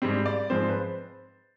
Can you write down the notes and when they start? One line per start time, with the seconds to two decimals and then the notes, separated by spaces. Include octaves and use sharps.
0.02 G#2 G3 C4
0.26 D5
0.50 G#2 F3 G#3 C4 C5
0.68 B4
0.74 C5